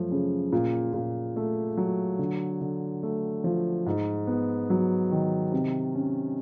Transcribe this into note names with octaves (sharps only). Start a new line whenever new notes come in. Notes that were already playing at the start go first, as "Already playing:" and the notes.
Already playing: F#2 F3 A3
C#3
A#2
A#2
A3
F#3
D3
D3
A3
F3
G#2
B3
F#3
D#3
C3
C#4